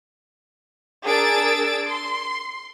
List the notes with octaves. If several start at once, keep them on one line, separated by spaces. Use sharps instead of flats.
D4 G#4 A#4 E6 A6 D7
C6